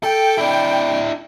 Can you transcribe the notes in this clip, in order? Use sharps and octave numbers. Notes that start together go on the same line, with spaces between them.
A4 G5
D4 E4